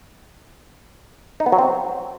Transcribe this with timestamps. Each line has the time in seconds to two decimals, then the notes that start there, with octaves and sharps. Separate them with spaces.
1.40 D#4
1.46 B3
1.52 F#3
1.59 C4